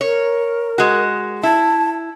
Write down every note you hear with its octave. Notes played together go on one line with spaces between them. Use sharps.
A#4 C#5
G#3 F#4
E4 A5